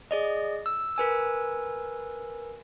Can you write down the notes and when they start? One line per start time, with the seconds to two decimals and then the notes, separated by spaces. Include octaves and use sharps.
0.11 G#4 D5 D#5
0.66 E6
0.96 A#4 B4 G#5 E6